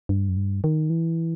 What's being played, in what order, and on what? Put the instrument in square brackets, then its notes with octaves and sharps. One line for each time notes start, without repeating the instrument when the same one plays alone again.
[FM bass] G2
F#2
G2
D#3
E3